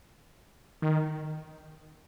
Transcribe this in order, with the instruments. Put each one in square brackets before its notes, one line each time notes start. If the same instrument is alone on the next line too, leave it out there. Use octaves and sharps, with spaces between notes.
[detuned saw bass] D#3